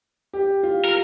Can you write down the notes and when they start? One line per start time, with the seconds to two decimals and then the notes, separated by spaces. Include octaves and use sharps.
0.33 G4
0.63 F4
0.85 A#4